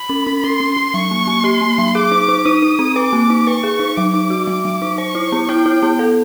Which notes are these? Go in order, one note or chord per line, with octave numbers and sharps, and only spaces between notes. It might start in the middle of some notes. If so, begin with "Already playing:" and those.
Already playing: B5
C#4
C#4
C#4 C6
C#4
C#4
F#3 C#6
A#3
A#3
G4 C6
A#3
F#3
G#4 D6
D#4
D#4
D#4 D#6
D#4
C4
B4 D6
A#3
D#4
B4 C#6
G#4
D#4
F#3 D6
D#4
F#4
F#3 D6
F#3
D#4
C5 C#6
E4
B3
E4 G5
E4
B3
A4